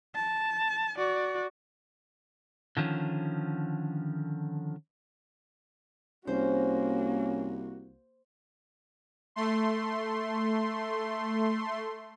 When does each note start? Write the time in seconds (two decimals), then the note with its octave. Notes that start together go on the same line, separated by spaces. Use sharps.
0.15 A5
0.98 F#4 D5
2.77 D3 D#3 F3 C#4
6.27 C2 A#3 C#4 F#4 C5
9.36 A3 C6